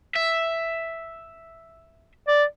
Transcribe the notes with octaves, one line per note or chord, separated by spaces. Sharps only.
E5
D5